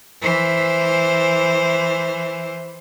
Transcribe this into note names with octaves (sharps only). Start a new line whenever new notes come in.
E3 C5